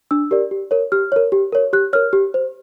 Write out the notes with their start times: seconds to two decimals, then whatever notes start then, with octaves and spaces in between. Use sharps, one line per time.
0.11 D4 E6
0.31 G4 A#4 D5
0.51 G4
0.71 A#4 C#5
0.92 G4 F6
1.12 A#4 C#5
1.32 G4
1.52 A#4 C#5
1.73 G4 F#6
1.93 A#4 C#5 F6
2.13 G4
2.34 C5